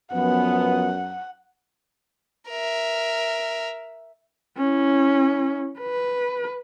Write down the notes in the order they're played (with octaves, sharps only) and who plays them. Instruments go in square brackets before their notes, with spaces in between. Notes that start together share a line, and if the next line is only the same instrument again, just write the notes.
[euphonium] F#2 [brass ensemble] F3 B3 [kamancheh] F#5
[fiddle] A#4 E5
[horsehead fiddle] C#4 E4
B4